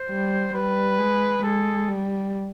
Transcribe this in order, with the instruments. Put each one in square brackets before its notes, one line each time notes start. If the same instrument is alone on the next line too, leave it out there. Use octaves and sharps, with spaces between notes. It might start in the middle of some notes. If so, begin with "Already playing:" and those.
Already playing: [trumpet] C5
[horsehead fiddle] G3
[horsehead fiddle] G3 [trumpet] B4
[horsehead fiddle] G#3
[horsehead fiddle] G#3 [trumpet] A4
[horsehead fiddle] G3